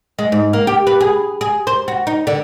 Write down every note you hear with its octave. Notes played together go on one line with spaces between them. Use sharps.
G#3
G#2
A#3
G4
B4
G#4
G#4
C5
F#4
D#4
D3